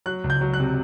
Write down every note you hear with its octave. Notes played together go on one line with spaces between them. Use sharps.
F#3 F#6
C#2
G6
F#3
F#6
C3